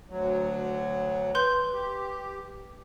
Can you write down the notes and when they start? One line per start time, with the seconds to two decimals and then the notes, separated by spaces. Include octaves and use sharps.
0.10 D2 F#3
1.35 B4 C6 G6
1.73 G4